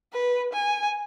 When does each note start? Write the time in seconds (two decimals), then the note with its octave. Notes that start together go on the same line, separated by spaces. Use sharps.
0.13 B4
0.53 G#5